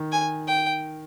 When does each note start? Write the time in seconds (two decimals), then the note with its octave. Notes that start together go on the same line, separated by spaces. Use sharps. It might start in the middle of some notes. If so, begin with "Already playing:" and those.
Already playing: D#3
0.12 G#5
0.47 G5